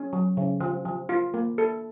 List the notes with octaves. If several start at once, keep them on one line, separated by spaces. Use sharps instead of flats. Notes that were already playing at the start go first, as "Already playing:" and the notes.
Already playing: C#4
F#3
C#3
F3
F3
F4
A#3
A4